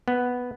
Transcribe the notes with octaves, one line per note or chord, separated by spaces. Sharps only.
B3